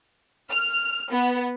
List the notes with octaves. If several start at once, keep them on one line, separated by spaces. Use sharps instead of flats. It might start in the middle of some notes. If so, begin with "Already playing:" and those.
F6
B3